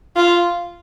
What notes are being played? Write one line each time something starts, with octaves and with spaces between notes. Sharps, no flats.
F4